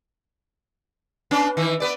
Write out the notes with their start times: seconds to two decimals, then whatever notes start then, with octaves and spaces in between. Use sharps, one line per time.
1.31 B3 C#4 D4
1.57 D#3 E3
1.80 B3 B4 D5